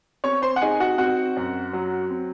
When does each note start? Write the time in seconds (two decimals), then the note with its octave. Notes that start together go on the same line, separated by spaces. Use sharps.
0.24 C4 C#5 C#6
0.42 C5 C6
0.56 F#5
0.62 D#4 G#4 G#5
0.80 F#4 F#5
0.98 C4 F#4 F#5
1.37 F#2
1.73 F#3
2.10 C4